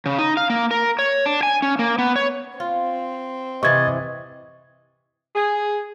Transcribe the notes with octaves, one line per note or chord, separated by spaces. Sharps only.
C#3
D#4
F5
A#3
A#4
C#5
D4
G#5
C#4
A#3
B3
C#5
C4 F4
C3 E3 D#5 C#6 G#6 A6
G#4